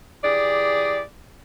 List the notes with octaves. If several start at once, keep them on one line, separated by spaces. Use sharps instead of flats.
E3 G4 G#4 D5